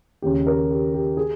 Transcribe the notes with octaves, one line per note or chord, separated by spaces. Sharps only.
D#2 C#3 G4
A#4
G4
G4
G#4